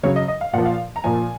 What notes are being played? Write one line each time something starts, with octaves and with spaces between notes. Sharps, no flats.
C#3 F#3 C#5
D#5
D#5
F5
A#2 F3 F#5
F5
A#5
A#2 F3 G#5